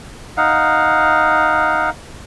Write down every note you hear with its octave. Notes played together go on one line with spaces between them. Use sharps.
D#4 F5 F#5